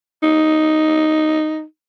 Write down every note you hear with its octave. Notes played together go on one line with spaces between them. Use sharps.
D#4